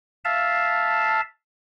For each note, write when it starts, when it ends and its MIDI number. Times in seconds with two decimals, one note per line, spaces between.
0.25 1.21 76
0.25 1.21 77
0.25 1.21 81